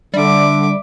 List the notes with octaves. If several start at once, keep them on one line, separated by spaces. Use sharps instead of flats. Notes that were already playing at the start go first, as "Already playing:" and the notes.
D3 G3 E5 D6